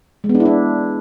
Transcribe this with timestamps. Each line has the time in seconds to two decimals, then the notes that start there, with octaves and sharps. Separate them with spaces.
0.24 G#3
0.29 B3
0.35 D4
0.40 E4
0.45 D4